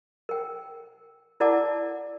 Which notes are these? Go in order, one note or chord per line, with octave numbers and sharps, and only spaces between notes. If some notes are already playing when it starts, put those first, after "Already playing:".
A#4 G5
E4 A#4 D5 F#5 A5 D6